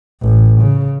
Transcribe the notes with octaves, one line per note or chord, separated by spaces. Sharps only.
A1
C#3